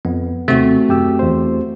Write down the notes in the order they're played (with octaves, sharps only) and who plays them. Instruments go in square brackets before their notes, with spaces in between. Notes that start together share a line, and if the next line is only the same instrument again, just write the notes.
[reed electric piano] F2 [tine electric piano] B3
[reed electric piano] D#2 C3 [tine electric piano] A3 C4 F#4
[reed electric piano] F#2 G4 E6
E2 C5